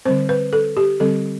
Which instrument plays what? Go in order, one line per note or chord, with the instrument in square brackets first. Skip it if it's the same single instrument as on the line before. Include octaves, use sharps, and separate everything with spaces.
[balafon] D3 G3 C4 C5
B4
A4
G4
D3 G3 C4 A4